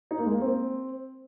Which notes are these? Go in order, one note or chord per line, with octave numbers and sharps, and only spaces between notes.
D#4
A#3
G#3
A#3
C4